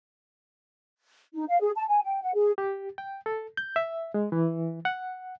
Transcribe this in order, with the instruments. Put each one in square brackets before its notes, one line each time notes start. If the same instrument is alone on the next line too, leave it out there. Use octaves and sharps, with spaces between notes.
[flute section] D#4
F5
G#4
A5
G#5
G5
F#5
G#4
[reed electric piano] G4
G5
A4
G6
E5
G#3
E3
F#5